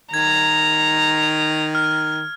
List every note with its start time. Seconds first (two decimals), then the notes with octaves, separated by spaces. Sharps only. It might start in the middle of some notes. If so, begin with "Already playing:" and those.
0.14 D#3 A#5 G#6
1.75 F6